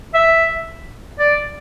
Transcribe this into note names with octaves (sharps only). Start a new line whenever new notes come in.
E5
D5